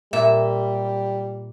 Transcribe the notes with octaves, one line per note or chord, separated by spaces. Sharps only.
A#2 G3 E5